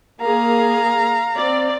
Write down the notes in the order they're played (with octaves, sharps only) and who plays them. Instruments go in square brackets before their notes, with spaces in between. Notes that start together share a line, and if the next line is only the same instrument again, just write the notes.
[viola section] A#3 G#4 [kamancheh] F5 A#5
[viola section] C4 D5